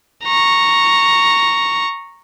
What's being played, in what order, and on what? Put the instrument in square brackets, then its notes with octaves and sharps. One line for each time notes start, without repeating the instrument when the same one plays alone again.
[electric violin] A#5 C#6